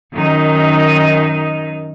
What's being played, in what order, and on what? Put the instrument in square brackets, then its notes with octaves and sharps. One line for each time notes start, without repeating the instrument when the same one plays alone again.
[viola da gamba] F#2 D#3 D#4